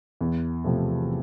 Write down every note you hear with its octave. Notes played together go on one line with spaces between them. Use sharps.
E2
C3 F3 A3